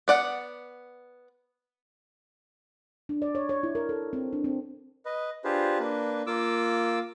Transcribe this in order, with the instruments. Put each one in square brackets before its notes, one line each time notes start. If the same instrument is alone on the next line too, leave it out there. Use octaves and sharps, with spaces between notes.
[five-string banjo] B3 D5 F#5
[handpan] D4
D5
C#5
C#5
E4
A#4
A4
C4
D4
C4
[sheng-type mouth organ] B4 D#5
D4 F4 G4 G#4 B4 C5
A#3 D4 B4
A#3 F4 D6 E6